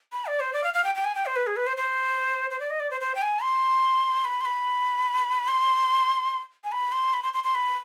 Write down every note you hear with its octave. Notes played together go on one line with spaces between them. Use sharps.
B5
D5
C5
D5
F5
F5
G5
G5
G#5
G5
C5
B4
G#4
B4
C5
C5
C5
D5
D#5
D5
C5
C5
G5
G#5
C6
B5
C6
B5
C6
G#5
B5
C6
B5
C6
C6
C6
B5